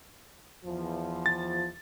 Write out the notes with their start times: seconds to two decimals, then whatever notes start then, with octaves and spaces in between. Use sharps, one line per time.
0.65 E2 F3
1.26 A6